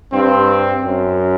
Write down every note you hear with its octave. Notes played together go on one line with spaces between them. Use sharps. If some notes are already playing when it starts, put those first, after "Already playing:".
G2 C4
F#2